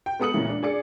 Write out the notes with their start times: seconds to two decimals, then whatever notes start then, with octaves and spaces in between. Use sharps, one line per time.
0.06 G5
0.19 G#3 B3 A4 D#6 C#7 F#7
0.34 A#2 C#3 E3
0.49 D4
0.63 G#4 D5 C#7